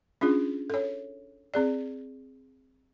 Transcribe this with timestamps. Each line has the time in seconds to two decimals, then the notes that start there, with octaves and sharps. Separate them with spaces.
0.21 C#4 D4 F4 G#4
0.70 A4 C#5
1.54 C4 G#4 D5